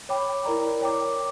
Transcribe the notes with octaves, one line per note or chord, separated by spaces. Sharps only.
C#5 G5 B5 D6
E4 A#4 D5 A#5
C#5 G5 A#5 D6